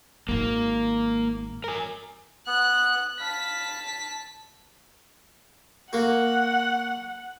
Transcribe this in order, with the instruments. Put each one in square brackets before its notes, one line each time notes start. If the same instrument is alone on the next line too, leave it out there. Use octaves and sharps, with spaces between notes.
[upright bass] G#1 G#3 [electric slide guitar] A#3
[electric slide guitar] A#4 G#5
[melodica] B3 F#5 [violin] F#6
[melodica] F5 B5 [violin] A5 B6
[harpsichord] A#3 F#4 [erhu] F#5